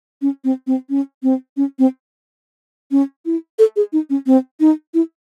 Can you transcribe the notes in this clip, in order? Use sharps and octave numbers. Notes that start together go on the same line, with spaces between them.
C#4
C4
C4
C#4
C4
C#4
C4
C#4
E4
A4
G#4
D#4
C#4
C4
D#4
E4